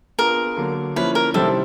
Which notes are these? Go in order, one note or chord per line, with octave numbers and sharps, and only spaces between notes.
B3 D4 F4 G#4 A#4
D3 F#3 A#3
F3 A#3 C#4 E4 B4
A#4
C3 D#3 G3 C4 E4 A4